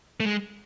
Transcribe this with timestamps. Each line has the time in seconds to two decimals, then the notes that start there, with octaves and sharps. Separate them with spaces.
0.20 A3
0.26 G#3